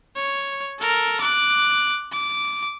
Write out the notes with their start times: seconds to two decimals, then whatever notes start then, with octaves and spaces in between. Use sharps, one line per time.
0.16 C#5
0.80 A4 A#4
1.21 D6 F#6
2.12 D6